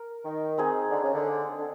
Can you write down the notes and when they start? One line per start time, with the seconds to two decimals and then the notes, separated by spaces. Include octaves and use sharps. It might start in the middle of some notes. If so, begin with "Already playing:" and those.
Already playing: A#4
0.25 D#3
0.58 C4 D#4 G#4
0.91 D3
1.03 C#3
1.14 D3
1.58 D3